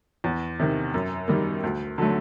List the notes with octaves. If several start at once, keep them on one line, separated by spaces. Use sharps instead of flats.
E2
C3 D#3
F#2
D#3 G3 A#3
D2
D3 F#3 A3